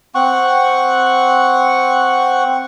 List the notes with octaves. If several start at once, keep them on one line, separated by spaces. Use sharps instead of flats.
C4 F#5 C#6